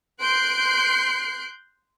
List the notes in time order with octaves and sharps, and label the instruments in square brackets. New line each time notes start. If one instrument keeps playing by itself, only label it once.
[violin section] C6 F#6 G6 C7 D7